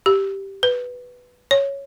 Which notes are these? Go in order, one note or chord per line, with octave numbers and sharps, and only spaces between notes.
G4
B4
C#5